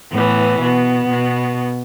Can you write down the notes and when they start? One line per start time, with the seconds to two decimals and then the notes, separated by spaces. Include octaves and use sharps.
0.11 A2 E3 B3
0.60 B2 B3
1.10 B2